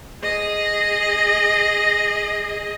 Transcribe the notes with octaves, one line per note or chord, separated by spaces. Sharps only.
G#4 D#5